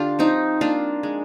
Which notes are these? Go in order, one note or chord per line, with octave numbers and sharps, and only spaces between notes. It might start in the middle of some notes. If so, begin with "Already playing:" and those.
Already playing: D3 D4 F4 G4
F3 C4 D#4
A#3 D4 F4
G#3